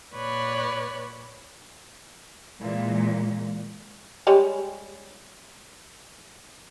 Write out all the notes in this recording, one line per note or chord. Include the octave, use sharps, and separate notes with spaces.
A#2 B4 C#5 D5 F#6
A#2 E3 G#3
G3 G#3 C#5